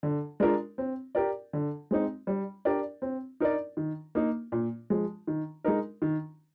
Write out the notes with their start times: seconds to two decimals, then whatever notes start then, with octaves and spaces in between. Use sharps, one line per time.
0.03 D3
0.40 G#3 D4 F4 A#4
0.78 C4
1.15 G4 A#4 D5
1.53 D3
1.91 G#3 C4 D#4
2.27 G3
2.65 D4 G4 A#4 D5
3.02 C4
3.40 D#4 A#4 D5
3.77 D#3
4.15 A#3 D#4
4.52 A#2
4.90 F3 G#3
5.27 D#3
5.64 G#3 D#4 A#4
6.02 D#3